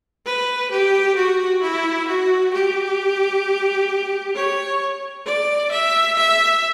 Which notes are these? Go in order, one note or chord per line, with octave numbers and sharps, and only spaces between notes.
B4
G4
F#4
E4
F#4
G4
C#5
D5
E5
E5